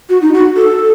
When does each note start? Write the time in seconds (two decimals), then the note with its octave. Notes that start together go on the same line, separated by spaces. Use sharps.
0.09 F#4
0.22 D#4
0.34 F#4
0.57 A4